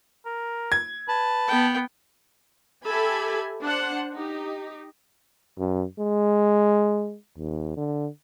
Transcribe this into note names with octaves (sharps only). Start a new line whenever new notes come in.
A#4
G#6
B4 A5
B3 G5
G4 A4 E5 G#5 B5
D4 C5 F#5
D#4 G4
F#2
G#3
D#2
D3